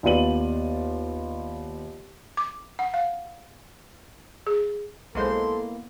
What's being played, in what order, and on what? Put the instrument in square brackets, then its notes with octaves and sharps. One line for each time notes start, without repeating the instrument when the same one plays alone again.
[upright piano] D#2 B3 F4 D5 D#7 F#7
[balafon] D6
F#5
F5
G#4
[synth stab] B1 G#3 C5 [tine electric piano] A#3 B3 E4 [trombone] A4 [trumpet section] C6